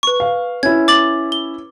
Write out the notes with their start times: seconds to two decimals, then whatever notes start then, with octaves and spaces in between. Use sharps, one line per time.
0.03 B4 C#6
0.20 F5
0.63 C#4 E4 G#6
0.88 D6 A6 F#7
1.32 G7